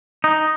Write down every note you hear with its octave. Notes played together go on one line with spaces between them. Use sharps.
D#4